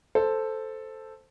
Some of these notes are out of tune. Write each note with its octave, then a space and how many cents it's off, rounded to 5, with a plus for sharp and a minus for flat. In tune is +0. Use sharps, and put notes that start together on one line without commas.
A4 +0 C5 +0